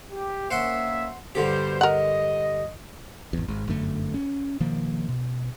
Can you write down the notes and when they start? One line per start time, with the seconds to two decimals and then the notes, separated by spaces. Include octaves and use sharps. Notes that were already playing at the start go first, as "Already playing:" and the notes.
0.11 G4
0.51 A#3 C#4 C5 E5 F#5 C6
1.35 G2 B2 D3 G3 G4 C5
1.81 A#4 D#5 F#5
3.33 G#1 E2
3.48 G#1 G#2
3.68 G1 F#2 D3 A3
4.14 C#4
4.60 B2 D#3 F3 A#3
5.09 B2